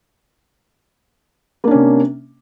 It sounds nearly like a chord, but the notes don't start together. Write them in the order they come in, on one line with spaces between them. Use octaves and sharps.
A#3 D4 C#4 C3